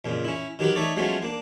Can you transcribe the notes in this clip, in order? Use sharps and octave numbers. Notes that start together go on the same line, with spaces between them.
F2 A#2 C#3
C#4 E4
D#3 F#3 G4 A#4 B4
A3 D#4 A4 C#5 D5
F3 F#3 G#3 A3 B3 C#4
A#3 D4